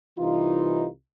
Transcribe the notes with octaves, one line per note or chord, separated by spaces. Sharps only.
C2 E3 D#4 F4